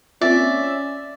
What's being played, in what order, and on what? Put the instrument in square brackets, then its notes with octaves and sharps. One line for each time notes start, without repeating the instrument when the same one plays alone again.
[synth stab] A#3 C4 F4 [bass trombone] C#4 [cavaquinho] D5 [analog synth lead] E5